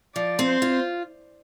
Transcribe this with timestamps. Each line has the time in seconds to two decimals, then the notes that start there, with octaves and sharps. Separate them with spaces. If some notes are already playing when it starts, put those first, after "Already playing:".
0.15 F3 D5
0.39 C4
0.47 C5
0.62 F4